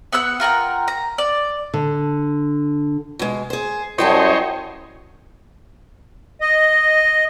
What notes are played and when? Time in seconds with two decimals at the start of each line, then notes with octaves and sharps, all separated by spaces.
0.12 B3 F#5 E6 F#6
0.40 F4 A#4 F#5 G5
0.88 A#5
1.18 D5
1.74 D3
3.19 B2 G#3
3.50 G#4 C5
3.98 F#2 G3 E4 C5 C#5 D#5 G5 A5
6.41 D#5